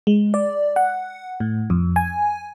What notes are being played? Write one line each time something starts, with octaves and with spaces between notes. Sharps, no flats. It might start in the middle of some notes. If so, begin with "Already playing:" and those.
G#3
D5
F#5
A2
F2
G#5